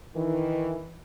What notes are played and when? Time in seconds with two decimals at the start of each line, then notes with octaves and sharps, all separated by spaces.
0.15 D#3 E3